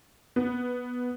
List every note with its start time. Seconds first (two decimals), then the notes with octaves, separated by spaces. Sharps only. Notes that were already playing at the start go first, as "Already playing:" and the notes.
0.36 B3